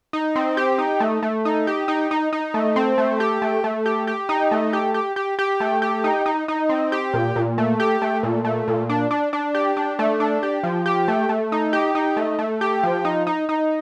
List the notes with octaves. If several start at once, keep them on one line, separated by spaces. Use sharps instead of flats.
D#4
C4
G4
D#4
A3
A3
D#4
G4
D#4
D#4
D#4
A3
C4
A3
G4
A3
A3
G4
G4
D#4
A3
G4
G4
G4
G4
A3
G4
D#4
D#4
D#4
C4
G4
A#2
A#2
A3
G4
A3
A#2
A3
A#2
D4
D4
D4
G4
D4
A3
D4
G4
F3
G4
A3
A3
D#4
G4
D#4
A3
A3
G4
F3
D#4
D#4
D#4